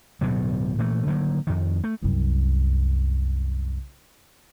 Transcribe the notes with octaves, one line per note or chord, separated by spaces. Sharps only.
D1 G2 B2 F#3
A#2 E3 A3
D3 D#3 F#3 A#3
F2 D#3
A3
C2 F#2